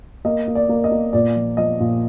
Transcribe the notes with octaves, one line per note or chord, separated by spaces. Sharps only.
A#3 D#5
A#3
D5
A#3
D#5
A#3
A#2 D5
F3
F3 D#5
A#2